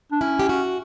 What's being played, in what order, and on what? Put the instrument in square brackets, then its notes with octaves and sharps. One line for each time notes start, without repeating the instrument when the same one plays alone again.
[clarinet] D4
[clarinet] C#4 [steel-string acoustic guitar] E4
[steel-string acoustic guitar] G4
F#4